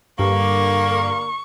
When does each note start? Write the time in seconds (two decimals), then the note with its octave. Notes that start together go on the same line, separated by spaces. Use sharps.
0.19 G2 D3 A#3 C#6